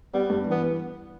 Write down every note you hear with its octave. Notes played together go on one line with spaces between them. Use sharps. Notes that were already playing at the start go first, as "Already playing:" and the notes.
G3 B3
G2
E3 B3